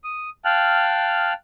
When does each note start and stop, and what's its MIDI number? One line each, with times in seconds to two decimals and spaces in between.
0.04 0.30 87
0.45 1.33 77
0.45 1.33 79
0.45 1.33 81
0.45 1.33 89
0.45 1.33 90